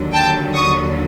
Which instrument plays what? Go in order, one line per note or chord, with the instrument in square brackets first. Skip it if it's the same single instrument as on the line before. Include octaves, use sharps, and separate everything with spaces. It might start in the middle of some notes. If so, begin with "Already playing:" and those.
Already playing: [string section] D#2 D3 F#3
G5 A5
C#6 D#6